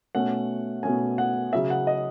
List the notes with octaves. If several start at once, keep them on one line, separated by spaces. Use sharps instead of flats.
B2 A3 C#4 F#5
B2 A3 C#4 G#5
F#5
C#3 F#3 C#4 E5
F#5
D#5